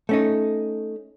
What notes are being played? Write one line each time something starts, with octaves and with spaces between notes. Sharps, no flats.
A3 C#4 D#4